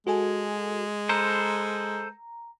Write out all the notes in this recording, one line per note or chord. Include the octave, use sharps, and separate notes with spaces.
G#3 F#4 A4 G#5
A4 B4 C5 A#5